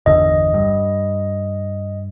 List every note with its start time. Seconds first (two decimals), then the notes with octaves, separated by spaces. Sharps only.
0.06 G1 E2 D3 D#5
0.54 G2